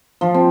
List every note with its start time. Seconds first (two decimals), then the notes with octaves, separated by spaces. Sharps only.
0.21 F3
0.34 C4